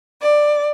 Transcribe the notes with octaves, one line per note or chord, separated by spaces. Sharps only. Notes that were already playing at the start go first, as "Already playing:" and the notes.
D5